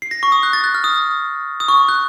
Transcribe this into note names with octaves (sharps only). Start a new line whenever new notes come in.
C7
A#6
C#6
D#6
F#6
A6
F#6
F6
D#6
D#6
C#6
F#6